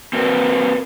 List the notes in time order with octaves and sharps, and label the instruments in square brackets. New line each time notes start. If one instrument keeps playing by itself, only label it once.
[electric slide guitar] C4 F#4 A#4 B4